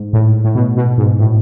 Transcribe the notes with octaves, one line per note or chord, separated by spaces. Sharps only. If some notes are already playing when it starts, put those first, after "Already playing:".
Already playing: G#2
A2
A2
B2
B2
G#2
A2